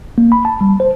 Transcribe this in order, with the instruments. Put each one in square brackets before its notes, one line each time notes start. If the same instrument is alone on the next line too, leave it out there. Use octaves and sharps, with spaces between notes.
[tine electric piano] A#3
B5
A5
G3
C5